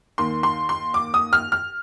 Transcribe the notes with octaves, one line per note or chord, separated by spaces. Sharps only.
D#2 D#3 C6
C6
C6
D6
D#6
F6
F6